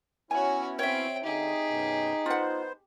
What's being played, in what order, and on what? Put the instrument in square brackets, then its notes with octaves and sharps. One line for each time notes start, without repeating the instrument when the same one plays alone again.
[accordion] B3 C#4 E4 [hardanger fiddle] F#4 C#5 [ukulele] G#5
[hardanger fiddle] C4 G5 [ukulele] C#5 E5
[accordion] D3 [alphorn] D#4 [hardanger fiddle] G4 G#4
[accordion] F#2 B2
[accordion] B3 C5 [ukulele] F4 F#5